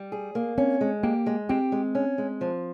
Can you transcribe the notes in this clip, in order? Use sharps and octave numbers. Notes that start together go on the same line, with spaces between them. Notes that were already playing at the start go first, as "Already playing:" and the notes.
Already playing: G3
G#4
A#3
C4 C#4
G#3
A#3 G4
G#3
C4 G4
G#3
C#4
G#3
F3